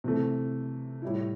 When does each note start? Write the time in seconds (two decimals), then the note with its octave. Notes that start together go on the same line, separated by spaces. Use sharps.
0.04 C3 E3 A3
1.02 A2 G3 E4